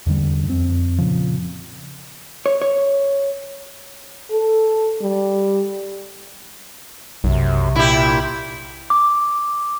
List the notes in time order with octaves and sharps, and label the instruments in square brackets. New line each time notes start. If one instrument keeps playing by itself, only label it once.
[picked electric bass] E2 D3 G3
F2 C4
A#2 C#3 F3
[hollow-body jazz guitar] C#5
C#5
[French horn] A4
G3
[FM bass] B1 [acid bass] F#2 [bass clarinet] C3
[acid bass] A#2 [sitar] E4 G4
[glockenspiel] D6